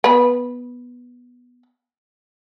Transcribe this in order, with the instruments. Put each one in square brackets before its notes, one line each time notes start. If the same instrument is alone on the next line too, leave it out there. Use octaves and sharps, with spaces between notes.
[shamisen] B3 B4